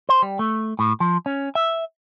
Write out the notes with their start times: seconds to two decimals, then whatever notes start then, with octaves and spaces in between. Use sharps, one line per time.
0.09 C5
0.22 G3
0.39 A3
0.79 A2
1.00 F3
1.26 C#4
1.55 E5